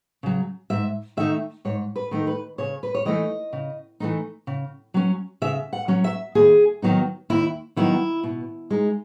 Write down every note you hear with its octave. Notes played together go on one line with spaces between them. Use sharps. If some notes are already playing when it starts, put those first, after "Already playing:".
C#3 F#3
G#2 E5
D#3 A3 D#4 E5
G#2 C#5
B4
D#3 A3 D#4
B4
C#3 C#5
B4
C#5
E3 A3 D#4 D#5
C#3
E3 A3 D#4
C#3
F#3 C#4
C#3 E5
F#5
F#3 C#4
E5
D#2 G#4
D#3 F#3 B3 D#4
D#2 E4
D#3 F#3 B3 D#4 E4
B2
G#3 D#4